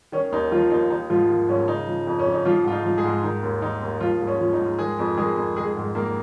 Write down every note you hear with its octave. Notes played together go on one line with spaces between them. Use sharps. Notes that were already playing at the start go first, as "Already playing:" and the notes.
D#3 C#4
D#2 D#4
D#3 F3 F4
D#2 D#4
D#3 D#4
G#2 F3 F4
D#3
G#2 C#4
C#3 D#4
F3
F2
C#4
F2
D#4
F3 F4
G#2 F4
D#4
F3
G#3 G#4
G#2
D#3 D#4
D#2
D#3 D#4
D#2
F3 F4
G#2
C#4
F3
D#4
G#2
D#3 G#3 G#4
F2
D#3 G#3 G#4
F2
D#3 G#3 G#4
G#2
D#3 A#3 A#4